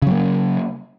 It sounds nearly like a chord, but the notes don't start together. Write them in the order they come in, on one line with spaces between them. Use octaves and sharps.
C#3 F#3 A#3